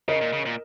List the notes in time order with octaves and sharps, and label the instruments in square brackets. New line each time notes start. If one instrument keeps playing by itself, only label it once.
[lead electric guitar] C#3 [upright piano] A#4 D#5
[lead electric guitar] A#2
C#3
A#2